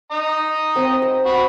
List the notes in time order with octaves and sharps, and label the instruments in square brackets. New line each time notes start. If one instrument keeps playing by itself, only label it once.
[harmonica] D#5 A#5
[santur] C4
E6
[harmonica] F#4 B5